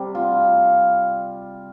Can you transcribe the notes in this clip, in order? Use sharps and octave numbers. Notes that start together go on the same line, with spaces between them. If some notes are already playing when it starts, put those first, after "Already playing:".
Already playing: C3 G3 G4
F4